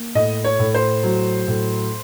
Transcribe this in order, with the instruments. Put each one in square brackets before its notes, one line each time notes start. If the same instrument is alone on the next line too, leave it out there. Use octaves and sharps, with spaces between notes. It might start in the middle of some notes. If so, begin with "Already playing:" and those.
Already playing: [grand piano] A#3
A2 D#5
C#5
A2
C5
F#3
A2